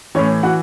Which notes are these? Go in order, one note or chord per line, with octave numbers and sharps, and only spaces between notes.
A2 E3 C#4 C#5
E3 F#4 F#5